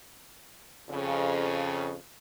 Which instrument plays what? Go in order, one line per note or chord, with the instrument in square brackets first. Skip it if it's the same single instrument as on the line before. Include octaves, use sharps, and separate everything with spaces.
[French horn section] F2 C#3